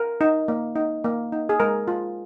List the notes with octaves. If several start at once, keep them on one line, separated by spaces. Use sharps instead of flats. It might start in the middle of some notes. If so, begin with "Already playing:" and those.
Already playing: A#4
D#4
A#3
D#4
A#3
D#4
G#4
G#3 A#4
F4